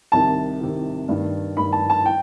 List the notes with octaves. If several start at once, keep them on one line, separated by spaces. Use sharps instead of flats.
C2 C3 D#3 A5
C2 C3 D#3
G2 D#3
G2 D#3 B5
A5
A5
G5